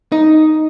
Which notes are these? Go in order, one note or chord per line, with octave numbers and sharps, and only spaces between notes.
D#4